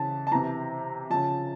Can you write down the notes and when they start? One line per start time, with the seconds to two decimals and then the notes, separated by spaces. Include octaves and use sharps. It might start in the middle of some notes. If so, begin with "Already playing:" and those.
Already playing: C#3 E3 A5
0.27 A5
0.31 C3 E3 A#5
1.10 C#3 F3 A5